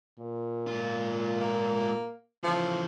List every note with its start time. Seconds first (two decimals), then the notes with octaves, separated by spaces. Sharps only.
0.19 A#2
0.67 G#2 F4
1.40 A#3
2.44 C#3 E3 F3